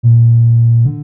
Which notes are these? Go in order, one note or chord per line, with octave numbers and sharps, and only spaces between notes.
A#2
D3